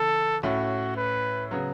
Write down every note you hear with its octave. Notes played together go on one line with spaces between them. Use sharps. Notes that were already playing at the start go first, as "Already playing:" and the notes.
Already playing: C#3 E3 A4
A2 A3 C#4 E4 F#4
B4
C#3 F#3 B3